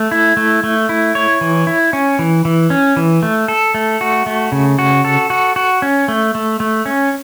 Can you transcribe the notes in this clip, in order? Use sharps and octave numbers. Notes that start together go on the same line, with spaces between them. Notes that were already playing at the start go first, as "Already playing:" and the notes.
Already playing: A3
E4
A3
A3
E4
C#5
E3
E4
C#4
E3
E3
C#4
E3
A3
A4
A3
F#4
A3
C#3
F#4
A4
F#4
F#4
C#4
A3
A3
A3
C#4